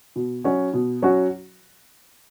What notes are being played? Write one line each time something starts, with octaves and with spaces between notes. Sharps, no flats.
B2
F#3 C#4 F#4
B2
F#3 C#4 F#4